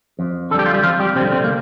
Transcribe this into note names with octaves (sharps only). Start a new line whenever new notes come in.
F2
D3 G3 G4 A4
F4
G3 G4
F2 F3 F4
G3 G4
C3 D3 G3 C4
C3 C4
A#3